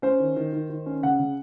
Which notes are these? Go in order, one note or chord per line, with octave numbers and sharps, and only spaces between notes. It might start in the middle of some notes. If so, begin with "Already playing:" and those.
C#4 C5
D#3
D#3
D#3
D#3
C#4
C#3 F#5
C#3